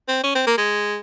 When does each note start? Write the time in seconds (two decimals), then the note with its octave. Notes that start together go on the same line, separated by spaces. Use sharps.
0.08 C4
0.24 C#4
0.35 C4
0.47 A#3
0.58 G#3